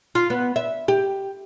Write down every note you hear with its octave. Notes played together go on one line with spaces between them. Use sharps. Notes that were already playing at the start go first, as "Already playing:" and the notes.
F4
B3
E5
G4